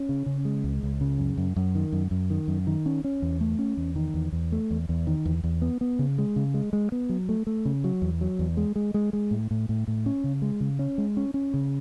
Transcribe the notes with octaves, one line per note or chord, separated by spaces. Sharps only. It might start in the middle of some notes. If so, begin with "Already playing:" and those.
Already playing: C#4
C#3
C#3
G#3
C#2
C#2
C#3
F#2
F#2
F#2
D#3
F#2
F#2
D#3
F#2
D#3
C#4
C#4
E2
A3
C#4
E2
D#3
E2
E2
A3
E2
E2
D#3
E2
E2
B3
B3
C#3
G#3
C#3
G#3
G#3
B3
F#3
A3
A3
C#3
F#3
E2
F#3
E2
G#3
G#3
G#3
G#3
A2
A2
A2
A2
C#4
C#3
G#3
C#3
C#4
G#3
C#4
C#4
C#3